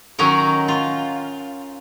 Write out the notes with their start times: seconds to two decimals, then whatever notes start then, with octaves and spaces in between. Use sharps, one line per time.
0.19 D#3 F#3 C#4 D#4 A#4
0.68 F4